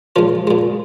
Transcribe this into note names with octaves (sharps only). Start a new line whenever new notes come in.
A#2 F3 G#3 F4
A#2 G#3